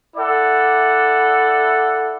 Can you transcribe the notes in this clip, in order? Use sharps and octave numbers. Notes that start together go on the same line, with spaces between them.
E4 A4 D5 F#5